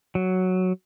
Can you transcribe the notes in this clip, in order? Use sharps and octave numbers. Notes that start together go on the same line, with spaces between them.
F#3